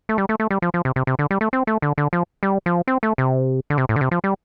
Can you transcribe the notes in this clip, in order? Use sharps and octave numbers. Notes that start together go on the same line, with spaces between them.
A3
G3
A3
A3
G3
F3
F3
C3
C3
C3
D3
G3
A3
C4
A3
D3
D3
F3
G3
F3
C4
A3
C3
D3
C3
A2
D3
C3
F3
G3